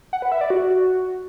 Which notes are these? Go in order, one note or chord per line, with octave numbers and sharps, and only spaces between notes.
F#5
B4
E5
D5
F#4